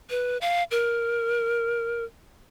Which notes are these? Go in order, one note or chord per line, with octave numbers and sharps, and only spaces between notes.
B4
F5
A#4